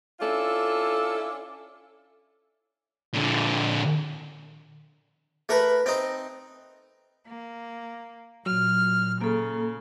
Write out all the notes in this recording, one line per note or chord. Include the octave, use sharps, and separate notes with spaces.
C#4 D4 E4 F4 A4
A#2 D3
A3 A#4 B4
C4 D#4
A#3
A#2 F#3 F6
C#3 A#3 A4